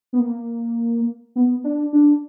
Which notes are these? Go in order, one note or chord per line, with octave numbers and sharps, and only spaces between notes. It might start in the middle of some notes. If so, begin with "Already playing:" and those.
B3
A#3
B3
D4
D4